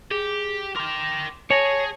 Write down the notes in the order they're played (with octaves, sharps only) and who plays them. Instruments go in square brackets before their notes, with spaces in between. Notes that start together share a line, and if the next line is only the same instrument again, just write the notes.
[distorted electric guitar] G4 [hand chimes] G#4
[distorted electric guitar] A#4 G5 [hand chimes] C6 D6
[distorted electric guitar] G#4 [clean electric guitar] C#5 [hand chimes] G#5 A5 A#6